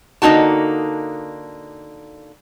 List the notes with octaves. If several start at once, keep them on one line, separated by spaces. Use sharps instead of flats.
D3 A#3 D#4 F#4 A5